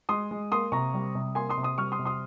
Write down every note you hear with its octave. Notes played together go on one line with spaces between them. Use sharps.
G#3 C6 D#6
G#3
A#3 C6 D#6
C3 A#5 C#6
G3
C3
A#3 G#5 C6
C6 D#6
C3
C6 D#6
G3 C#6 F6
C6 D#6
C3
C6 D#6